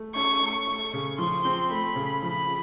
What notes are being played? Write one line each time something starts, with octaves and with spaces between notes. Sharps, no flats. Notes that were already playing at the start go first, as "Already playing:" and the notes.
Already playing: A3
C#4 C#6
A3
A3 C#6
C#3
F3 C6
C4
A3 B5
C#3
F3 B5